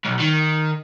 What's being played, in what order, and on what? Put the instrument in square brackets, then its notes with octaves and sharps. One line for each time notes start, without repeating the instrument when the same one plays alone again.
[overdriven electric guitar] B1
D#3